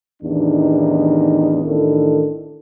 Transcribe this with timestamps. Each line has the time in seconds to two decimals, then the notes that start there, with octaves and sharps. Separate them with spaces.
0.21 A1 E2 D#3 D4 D#4
1.63 A1 D#3 D4 E4 A4